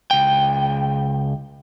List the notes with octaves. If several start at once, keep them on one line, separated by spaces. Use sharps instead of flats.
C#2 G5